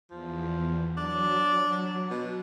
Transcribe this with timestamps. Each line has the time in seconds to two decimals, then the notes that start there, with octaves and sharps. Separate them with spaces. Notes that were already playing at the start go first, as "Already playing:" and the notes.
0.11 E2 F3
0.97 F#3 D4
2.10 B2